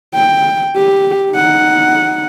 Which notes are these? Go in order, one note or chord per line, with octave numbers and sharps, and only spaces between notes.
G5
G4
D#4 F#5